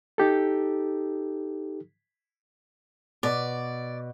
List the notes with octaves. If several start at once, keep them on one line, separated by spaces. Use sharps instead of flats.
D#4 G4 A4
B2 D5